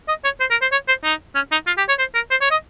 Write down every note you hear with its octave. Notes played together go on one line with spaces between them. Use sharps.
D#5
C#5
C5
A#4
C5
C#5
C5
D#4
C#4
D#4
F4
G4
C#5
C5
A#4
C5
C#5
D#5